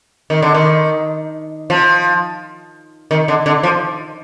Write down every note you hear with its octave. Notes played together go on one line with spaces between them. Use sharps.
D#3
D3
D#3
F3
D#3
D3
D3
F3